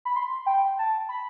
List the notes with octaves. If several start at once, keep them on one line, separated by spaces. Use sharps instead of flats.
B5
C6
G5
A5
B5